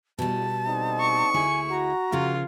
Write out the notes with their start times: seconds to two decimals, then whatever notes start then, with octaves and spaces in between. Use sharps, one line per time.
0.19 E2 B2 G3 A5
0.67 D3 C4 D#4
1.00 C#6
1.34 D2 E4 G#4 G#5
1.70 F#4 A#5
2.12 C#3 F3 F4 A#4